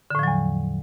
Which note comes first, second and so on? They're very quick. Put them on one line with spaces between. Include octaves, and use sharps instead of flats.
D3 A2 F3 F#3 E2